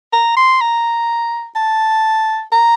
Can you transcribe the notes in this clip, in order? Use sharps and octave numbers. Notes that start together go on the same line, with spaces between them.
A#5
C6
A#5
A5
A#5